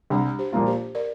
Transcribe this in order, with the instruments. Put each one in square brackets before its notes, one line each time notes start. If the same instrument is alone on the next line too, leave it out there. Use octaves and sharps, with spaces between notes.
[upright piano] C2 [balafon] D4 G4
[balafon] G4 C5
[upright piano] A#2 F3 A#3 F4
[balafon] G4 C5
A#4 D5